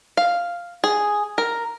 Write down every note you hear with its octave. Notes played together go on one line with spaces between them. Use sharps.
F5
G#4
A#4